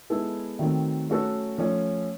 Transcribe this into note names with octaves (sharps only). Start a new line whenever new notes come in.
G#3 B3 E4 A4
D#3 F#3 A3 C4
F#3 A3 C#4 F#4 A4
F3 A3 C#4